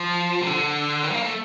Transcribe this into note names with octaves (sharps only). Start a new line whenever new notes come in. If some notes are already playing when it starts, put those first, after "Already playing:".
Already playing: F3
C3
D3
D#3
A#3
A3